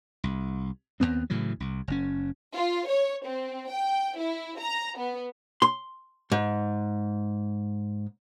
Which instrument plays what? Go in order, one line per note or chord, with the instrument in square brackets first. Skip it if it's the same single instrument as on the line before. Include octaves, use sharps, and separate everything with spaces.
[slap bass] C2
D#2 A2 B3 C4
A2 C#3 E3 F#3
C2
F#1 C#4
[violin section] F4
C#5
C4
G5
E4
A#5
B3
[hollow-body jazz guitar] C6
G#2